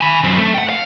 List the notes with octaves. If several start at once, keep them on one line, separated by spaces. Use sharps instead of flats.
G#5 B5
F#2 C4
A3 A4
F#5 G5
F5